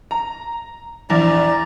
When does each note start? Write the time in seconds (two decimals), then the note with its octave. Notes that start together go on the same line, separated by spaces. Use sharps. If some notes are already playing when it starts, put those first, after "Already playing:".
0.11 A#5
1.10 A#1 E2 D5 A#5